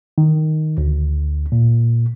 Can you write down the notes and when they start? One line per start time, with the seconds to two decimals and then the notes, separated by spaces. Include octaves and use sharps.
0.18 D#3
0.78 D2
1.52 A#2